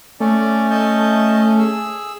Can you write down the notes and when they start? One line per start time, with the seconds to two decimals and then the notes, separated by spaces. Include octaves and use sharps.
0.20 A3 C#4 D5
0.70 D#5 A5 G6
1.59 G#4 E6